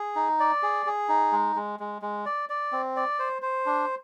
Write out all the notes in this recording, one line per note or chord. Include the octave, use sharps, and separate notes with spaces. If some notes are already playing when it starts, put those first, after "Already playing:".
Already playing: G#4
D#4
D5
G#4
G#4
D#4
G#3
G#3
G#3
G#3
D5
D5
C4
D5
C5
C5
D4